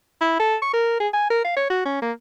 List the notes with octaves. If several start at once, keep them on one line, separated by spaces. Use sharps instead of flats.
E4
A4
C#6
A#4
G#4
G#5
A#4
F5
C#5
F#4
C#4
A#3